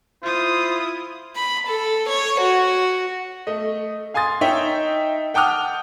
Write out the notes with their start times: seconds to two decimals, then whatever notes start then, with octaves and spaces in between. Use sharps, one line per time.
0.23 E4 F4 C5 D#6
1.36 B5
1.67 A4
2.09 C#5
2.40 F#4
3.47 A3 D#5
4.14 F5 G#5 C6 D#6 A6
4.41 D#4 C#5 D#5 E5 G5
5.34 F#5 G5 A5 D6 D#6 F6